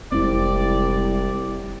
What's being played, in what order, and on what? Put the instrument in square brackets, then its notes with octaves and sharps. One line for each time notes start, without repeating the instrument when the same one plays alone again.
[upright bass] F1 G#3 [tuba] C2 [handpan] C4 E4 [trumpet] D5